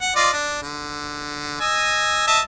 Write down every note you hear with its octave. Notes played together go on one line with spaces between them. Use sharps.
F#5
F4 D5 D#5
D4
D3
D#5 G#5 E6
D#5 E5 A5